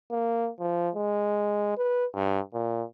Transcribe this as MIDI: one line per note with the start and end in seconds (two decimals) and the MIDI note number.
0.11 0.50 58
0.60 0.90 53
0.96 1.77 56
1.77 2.06 71
2.14 2.40 43
2.54 2.84 46